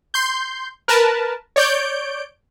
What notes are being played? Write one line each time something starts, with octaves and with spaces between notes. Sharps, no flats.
C6 G6
A#4 B4 A5
C#5 D5 G6 D7